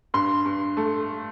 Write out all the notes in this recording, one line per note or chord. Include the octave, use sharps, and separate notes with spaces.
G2 C6
G2
A3